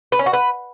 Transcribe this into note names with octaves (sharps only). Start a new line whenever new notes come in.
B4
C#4
F#4
B4